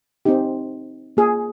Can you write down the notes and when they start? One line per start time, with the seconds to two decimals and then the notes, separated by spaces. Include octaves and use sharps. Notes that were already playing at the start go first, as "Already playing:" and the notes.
0.25 C4 D#4 G4
1.17 A#3 F4 G#4